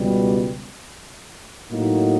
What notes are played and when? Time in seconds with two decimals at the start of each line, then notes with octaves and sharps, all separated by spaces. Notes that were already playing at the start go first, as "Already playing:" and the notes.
Already playing: C#2 B2 G3
1.70 A2 F#3 A#3 D#4 F#4